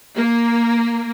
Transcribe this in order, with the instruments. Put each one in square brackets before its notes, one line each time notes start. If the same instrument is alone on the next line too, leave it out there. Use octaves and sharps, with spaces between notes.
[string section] A#3